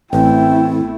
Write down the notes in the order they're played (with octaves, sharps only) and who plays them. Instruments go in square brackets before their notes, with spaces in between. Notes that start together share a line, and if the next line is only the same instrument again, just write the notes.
[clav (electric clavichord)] A1 [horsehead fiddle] A3 E4 [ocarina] C4 [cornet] G5